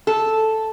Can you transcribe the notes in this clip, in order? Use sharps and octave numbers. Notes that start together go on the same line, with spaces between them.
A4